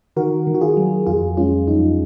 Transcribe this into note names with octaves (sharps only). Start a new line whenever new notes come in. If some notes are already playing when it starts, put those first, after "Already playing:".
D#3 F#4 A#4
D#3
F#4
F4 G#4
F#3
F2 F4 G#4
G#3 C#4 F4
F2 D#4